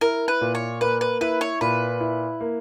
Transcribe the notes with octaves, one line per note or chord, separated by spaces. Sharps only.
E4 A#4
B4
A#2
C#5
A#3 B4
B4
E4 B4
C#5
A#2 B4
E4
A#3